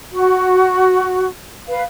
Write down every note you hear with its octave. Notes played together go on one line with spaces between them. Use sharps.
F#4
B4 F5